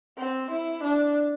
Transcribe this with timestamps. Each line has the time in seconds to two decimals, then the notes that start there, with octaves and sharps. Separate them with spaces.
0.18 C4
0.51 E4
0.83 D4